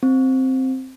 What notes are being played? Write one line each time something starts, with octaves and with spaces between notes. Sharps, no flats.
C4